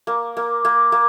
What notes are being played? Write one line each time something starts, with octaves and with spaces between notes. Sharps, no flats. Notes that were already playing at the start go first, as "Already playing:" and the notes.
A#3
A#3
A#3
A#3